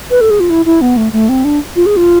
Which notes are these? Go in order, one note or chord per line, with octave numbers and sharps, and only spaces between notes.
B4
A4
G#4
F4
E4
E4
B3
A3
A3
C4
D4
F4
G#4
F4